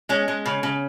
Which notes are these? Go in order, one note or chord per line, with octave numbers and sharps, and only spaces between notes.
G#3 C#4
G#3
C#3
C#3